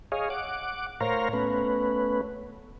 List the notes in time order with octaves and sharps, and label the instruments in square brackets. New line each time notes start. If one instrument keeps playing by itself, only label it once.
[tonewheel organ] G#4 C#5 D#5 F5
F#5 D6
A2 A#4 C5 C#5 F5 A#5
A3 B3 C#4 B4